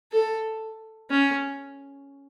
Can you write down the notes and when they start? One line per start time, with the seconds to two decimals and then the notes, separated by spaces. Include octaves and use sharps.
0.12 A4
1.10 C#4